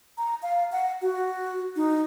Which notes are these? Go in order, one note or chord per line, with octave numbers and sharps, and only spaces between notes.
A#5
F5
F#5
F#4
D#4